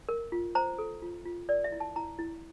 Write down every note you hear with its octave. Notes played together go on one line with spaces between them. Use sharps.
A#4
F4
C5 A#5
A4
F4
F4
A#4 D5
E5
E4
A5
E4 A#5
E4